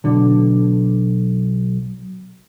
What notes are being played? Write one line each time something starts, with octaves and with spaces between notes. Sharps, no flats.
B1 D3